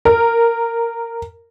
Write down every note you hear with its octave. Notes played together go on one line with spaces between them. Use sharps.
A#4